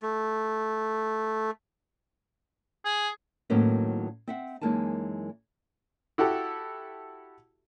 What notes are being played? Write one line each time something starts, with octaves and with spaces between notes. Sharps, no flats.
A3
G#4
A2 D#3 F#3 A#3 B3 C#4
C4 E5 F#5
F#2 E3 G#3 A#3 D#4 A5
E4 F#4 G4 A4